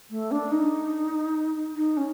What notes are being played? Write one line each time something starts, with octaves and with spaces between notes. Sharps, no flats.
A3
D4
D#4
D#4
C#4